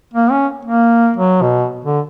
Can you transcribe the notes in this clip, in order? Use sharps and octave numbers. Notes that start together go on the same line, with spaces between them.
A#3
C#4
A#3
F#3
B2
D3